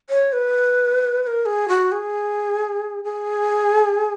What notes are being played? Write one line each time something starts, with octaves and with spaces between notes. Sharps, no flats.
C#5
B4
B4
A#4
G#4
F#4
G#4
G#4